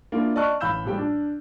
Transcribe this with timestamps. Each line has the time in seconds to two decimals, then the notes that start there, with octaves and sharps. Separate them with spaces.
0.12 A#3 D4 E4 F4
0.36 D5 D#5 A5 C#6 F6 F#6
0.60 A1 F5 B5 E6 G6 E7
0.85 A2 F3 G3 G5
0.98 D4